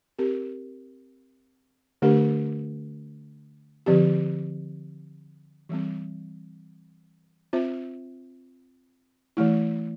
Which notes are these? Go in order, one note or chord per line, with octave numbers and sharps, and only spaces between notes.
C4 G4 A#4
D3 A3 D4 G4 A#4
D3 F3 C4 G4
E3 G3 C4
C4 F4 C5 E5
E3 A3 E4